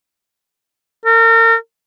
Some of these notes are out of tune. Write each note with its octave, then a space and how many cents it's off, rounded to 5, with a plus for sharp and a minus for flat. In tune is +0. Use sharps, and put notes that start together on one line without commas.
A#4 -35